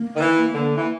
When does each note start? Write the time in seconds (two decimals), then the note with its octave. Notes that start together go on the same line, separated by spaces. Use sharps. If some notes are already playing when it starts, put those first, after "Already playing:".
Already playing: A#3
0.15 D#3
0.21 E3
0.54 D3
0.77 E3